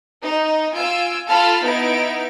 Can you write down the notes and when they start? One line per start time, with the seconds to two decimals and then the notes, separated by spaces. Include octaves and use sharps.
0.22 D#4
0.75 F4 G#5 E6 D7
1.29 F4 A4 A5 B5 F6
1.64 B3 D#4 E4 D7